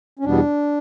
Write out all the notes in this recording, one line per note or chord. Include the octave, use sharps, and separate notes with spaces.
C#4
E2 B2 G3 B3 D4